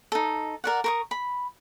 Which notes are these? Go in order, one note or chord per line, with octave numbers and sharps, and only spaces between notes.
D#4 A4
A#4 D5 F#5
A#4 C#6 D#6
B5